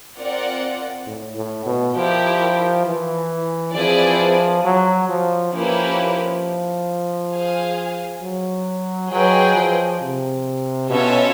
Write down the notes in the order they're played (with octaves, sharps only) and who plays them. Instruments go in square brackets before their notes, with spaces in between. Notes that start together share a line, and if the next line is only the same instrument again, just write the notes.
[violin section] C4 F4 A#4 D5 F#5
[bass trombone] A2
A2
B2
[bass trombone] F3 [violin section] E4 G4 A#4 D5 G5
[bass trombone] E3
[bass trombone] F3 [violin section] C4 E4 G#4 B4 D5
[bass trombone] F#3
F3
[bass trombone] F3 [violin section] A#3 C#4 E4 G4 B4
[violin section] G#4 C5 F5 G#5
[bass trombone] F#3
[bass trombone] F#3 [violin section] G#4 B4 D#5 G5
[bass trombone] F3
C3
[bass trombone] B2 [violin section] C#4 F4 A4 C#5 E5